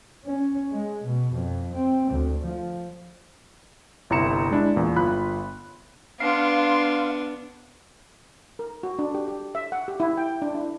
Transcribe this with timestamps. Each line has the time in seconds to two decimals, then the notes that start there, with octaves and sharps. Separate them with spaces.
0.24 C#4
0.72 G#3
1.04 B2
1.35 F2
1.75 C4
2.12 D2
2.44 F3
4.10 G1 C2 E4 A#5 C#7 E7
4.51 G#3 D4 E4
4.76 E2 A#2
4.96 G1 F4 B5 F#6
6.20 B3 D4 F5 C6
8.59 A#4
8.83 F#4
8.99 D4
9.15 G4
9.28 G4
9.55 E5
9.72 F#5
9.88 G4
10.00 E4
10.18 G5
10.42 D4
10.55 E4